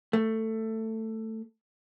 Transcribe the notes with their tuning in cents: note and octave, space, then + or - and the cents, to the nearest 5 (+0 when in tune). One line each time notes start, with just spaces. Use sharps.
A3 +15